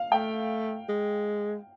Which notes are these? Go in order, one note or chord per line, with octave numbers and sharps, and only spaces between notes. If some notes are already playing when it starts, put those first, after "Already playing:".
Already playing: F5
A3 G5
G#3